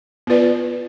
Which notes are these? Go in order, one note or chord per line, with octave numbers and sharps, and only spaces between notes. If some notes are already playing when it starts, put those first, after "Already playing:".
B3 F4 B4 D5